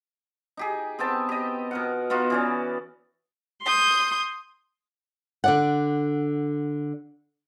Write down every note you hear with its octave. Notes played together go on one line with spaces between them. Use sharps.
D#4 G4 G#4
B3 C4 G5 A5
G4 D#5
B2 A#4 F#5
B3 D#4 F4 F#4
E3 C#4 D5
C6 D#6 G6
D3 D5 F#5